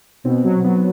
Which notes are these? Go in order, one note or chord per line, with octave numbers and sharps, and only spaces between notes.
B2 C4
F#3
F#3 B3